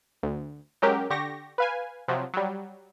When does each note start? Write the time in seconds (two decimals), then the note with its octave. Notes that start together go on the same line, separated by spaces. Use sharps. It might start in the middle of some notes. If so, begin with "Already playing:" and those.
0.23 D2
0.82 F#3 G#3 C#4 G4 A#4
1.10 D3 G4 C#6 A#6
1.58 B4 F5 G#5
2.08 C3 F3 F#3
2.34 F#3 G3